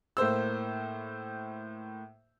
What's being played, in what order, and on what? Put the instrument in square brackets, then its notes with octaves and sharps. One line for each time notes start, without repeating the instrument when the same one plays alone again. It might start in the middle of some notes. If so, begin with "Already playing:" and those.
[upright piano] A2 A#3 C5 E6